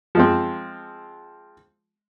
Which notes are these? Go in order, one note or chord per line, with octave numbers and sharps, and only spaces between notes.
F3 G#3 C4